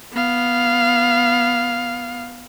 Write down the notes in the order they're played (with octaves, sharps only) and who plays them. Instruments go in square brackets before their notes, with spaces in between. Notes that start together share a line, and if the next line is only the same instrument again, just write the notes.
[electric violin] B3 F5